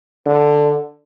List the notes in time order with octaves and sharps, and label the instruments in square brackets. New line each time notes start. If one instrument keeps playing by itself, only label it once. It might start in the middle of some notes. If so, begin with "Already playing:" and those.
[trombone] D3